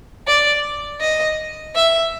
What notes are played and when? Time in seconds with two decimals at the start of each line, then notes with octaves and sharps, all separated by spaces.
0.27 D5
1.01 D#5
1.75 E5